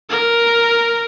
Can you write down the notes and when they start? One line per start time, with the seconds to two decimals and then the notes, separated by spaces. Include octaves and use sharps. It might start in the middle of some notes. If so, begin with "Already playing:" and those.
0.10 A#4